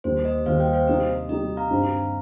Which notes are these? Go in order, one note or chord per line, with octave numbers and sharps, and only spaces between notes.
D#2 D#3 G3 C5
D#5
D#2 D#3 G3 C5 F5
D#5 G5
C5 F5
C3 G3 D#4 D#5
C3 G3 D#4 D#5
F5 A#5
G2 G3 C4 D#4